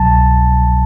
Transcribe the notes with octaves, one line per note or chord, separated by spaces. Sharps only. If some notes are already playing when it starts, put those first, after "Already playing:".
Already playing: C2 B2 F#3 A5